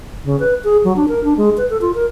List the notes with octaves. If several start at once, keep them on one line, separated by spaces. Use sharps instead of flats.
C#3
B4
G#4
F#3
D4
A#4
D4
G#3
B4
A4
F4
A#4